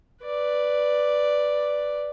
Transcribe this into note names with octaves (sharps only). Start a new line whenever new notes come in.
B4 D5